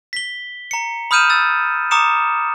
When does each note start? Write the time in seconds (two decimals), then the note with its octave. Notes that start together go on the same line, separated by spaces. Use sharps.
0.13 B6 G7
0.71 A#5 C#7
1.11 B5 D#6 F6 G6 D#7 E7
1.30 E6 A6
1.91 A#5 D6 D#6 C#7 E7